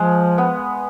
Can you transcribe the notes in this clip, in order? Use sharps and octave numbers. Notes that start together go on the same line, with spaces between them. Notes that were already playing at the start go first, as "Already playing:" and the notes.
Already playing: F3 G#3
B3